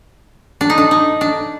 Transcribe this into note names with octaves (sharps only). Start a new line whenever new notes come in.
D4
D#4
D4
D#4
D4